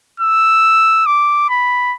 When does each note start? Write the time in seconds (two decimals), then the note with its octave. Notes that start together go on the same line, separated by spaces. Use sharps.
0.20 E6
1.06 D6
1.49 B5